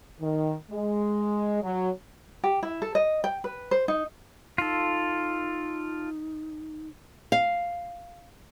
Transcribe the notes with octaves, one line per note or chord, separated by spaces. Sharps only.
D#3
G#3
F#3
G4
E4
A4
D#5
G5
B4
C5
D#4
D#4 F4 A4
F5